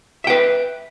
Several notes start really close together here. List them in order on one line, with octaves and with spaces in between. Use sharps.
E5 G5 B4